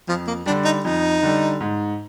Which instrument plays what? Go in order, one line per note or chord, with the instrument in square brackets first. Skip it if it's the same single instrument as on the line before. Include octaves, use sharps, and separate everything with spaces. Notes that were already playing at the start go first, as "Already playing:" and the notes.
[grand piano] F2 [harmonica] F3
[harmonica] A#3
[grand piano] G3 [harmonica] D4
[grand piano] D3
[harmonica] D#4
[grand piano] F2 [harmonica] D#4
[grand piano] D3 G3
G#2